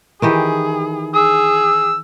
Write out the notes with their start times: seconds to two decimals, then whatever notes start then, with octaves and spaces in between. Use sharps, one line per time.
0.22 D#3 E3 G4 G#4
1.14 G#4 E6